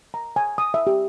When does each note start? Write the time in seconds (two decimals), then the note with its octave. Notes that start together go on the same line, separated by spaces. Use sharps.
0.14 A#5
0.36 G#5
0.58 D#6
0.74 E5
0.87 G4